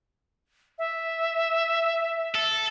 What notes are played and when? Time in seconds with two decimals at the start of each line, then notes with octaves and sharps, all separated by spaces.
0.78 E5
2.35 A4